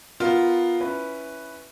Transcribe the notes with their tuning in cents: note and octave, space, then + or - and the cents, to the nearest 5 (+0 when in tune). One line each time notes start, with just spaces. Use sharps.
B3 +0 F4 +0 A#4 +0
C#4 +0 E4 -5 B4 +0